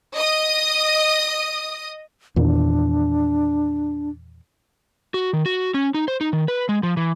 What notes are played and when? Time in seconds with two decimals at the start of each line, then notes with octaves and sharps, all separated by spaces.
0.15 D#5 D#6
2.36 E2 A#2 D#3 D4
5.14 F#4
5.33 D#3
5.46 F#4
5.74 C#4
5.94 D#4
6.08 C5
6.21 D#4
6.33 D#3
6.48 B4
6.69 G#3
6.83 F3
6.97 E3